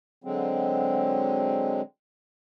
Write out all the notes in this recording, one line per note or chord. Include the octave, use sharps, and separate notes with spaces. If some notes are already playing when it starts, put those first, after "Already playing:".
D3 F#3 G#3 C4